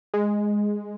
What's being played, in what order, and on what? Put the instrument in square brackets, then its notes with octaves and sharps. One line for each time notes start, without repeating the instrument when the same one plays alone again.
[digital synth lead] G#3